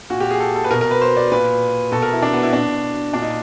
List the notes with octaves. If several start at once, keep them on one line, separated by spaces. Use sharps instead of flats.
A#2 F#4
G4
G#4
A4
A4
B4
B2 A#4
A#4
B4
C5
D5
A#2 B4
B2 A4
A#4
E4
D4
B3
E4
B2 D4
A#2 D4
D#4